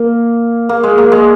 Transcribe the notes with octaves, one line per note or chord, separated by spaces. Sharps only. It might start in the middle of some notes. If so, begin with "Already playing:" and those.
Already playing: A#3
A#3
G#3
A#3
G#3